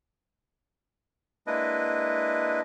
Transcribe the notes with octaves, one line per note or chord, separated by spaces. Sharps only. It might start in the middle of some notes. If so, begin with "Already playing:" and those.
G#3 A#3 D4 E4 B4 D#5